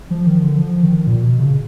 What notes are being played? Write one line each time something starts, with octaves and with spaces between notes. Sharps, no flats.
F3
D#3
D3
F3
D#3
A#2
B2
C#3